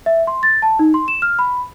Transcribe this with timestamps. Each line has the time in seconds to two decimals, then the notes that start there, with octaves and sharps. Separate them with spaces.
0.06 E5
0.27 C6
0.43 A6
0.62 A5
0.79 D#4
0.94 C6
1.08 E7
1.22 F6
1.39 B5